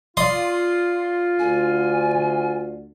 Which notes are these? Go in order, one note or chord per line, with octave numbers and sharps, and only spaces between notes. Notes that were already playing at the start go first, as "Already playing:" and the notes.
F4 D5 C6 D#6
D2 D3 G#5